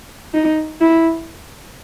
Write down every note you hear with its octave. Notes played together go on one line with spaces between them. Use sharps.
D#4
E4